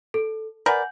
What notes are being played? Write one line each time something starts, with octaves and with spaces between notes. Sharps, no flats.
A4
A#4 B4 D5 F#5 G#5 G6